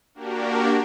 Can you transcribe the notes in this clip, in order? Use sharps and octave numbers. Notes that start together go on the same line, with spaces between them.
A#3 D4 F#4 G4 A#4